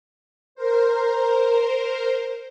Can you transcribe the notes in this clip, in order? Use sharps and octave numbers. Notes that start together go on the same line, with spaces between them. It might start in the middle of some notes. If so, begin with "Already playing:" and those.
A#4 C5